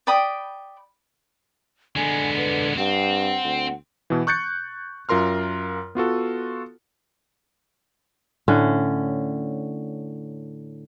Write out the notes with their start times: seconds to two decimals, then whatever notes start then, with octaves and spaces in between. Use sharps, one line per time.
0.07 D5 G5 B5 D#6
1.96 D3 G#3 B3 G#5
2.37 B4
2.77 G2 C4 F#5
3.44 D2
4.10 B2 E3
4.27 C#6 F#6 G6 A6 C#7
5.09 F#2 F4 A#4 C6 F6
5.95 B3 F4 F#4 A4
8.48 A2 D3 C#4